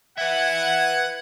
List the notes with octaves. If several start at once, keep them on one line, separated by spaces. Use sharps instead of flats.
B4 E5 F#5 G#6